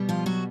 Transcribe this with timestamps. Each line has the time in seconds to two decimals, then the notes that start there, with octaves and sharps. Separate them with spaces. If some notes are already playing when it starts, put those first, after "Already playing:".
Already playing: B2 G3 B3
0.09 F3 F4
0.26 F#3 F#4